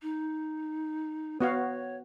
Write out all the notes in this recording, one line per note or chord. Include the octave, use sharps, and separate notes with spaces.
D#4
B3 F#4 C#5 F5